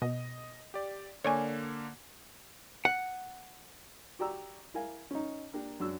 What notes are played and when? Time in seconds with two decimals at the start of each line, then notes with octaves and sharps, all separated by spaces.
0.02 B2 D#5
0.74 G4 D5
1.24 D3 A#3 C#5 D5 G#5
2.85 F#5
4.19 F#4 G4 D5 A#5 E6
4.74 E4 A#4 F5 G#5
5.11 C#4 D#4
5.53 A#3 D4 G4 A#4
5.80 F#2 D4 F#4 E6